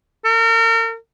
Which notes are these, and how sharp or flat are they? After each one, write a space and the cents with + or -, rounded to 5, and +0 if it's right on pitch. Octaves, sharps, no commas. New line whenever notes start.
A#4 -40